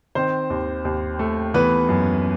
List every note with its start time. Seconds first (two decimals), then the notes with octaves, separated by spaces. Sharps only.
0.15 D#3 C4 C5
0.50 D#2
0.85 D#2
1.19 A3
1.54 E3 B3 B4
1.89 F#2